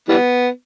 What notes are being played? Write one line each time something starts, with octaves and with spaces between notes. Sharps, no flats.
E3 G3 B3